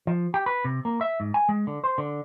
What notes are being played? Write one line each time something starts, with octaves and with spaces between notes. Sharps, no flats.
F3
G4
B4
C3
A#3
E5
G#2
G#5
G#3
D3
C5
D3